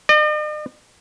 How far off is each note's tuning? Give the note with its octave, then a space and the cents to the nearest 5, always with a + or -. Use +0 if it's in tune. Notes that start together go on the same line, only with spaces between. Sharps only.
D#5 -45